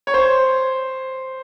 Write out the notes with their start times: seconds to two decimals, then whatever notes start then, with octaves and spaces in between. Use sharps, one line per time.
0.07 C#5
0.14 C5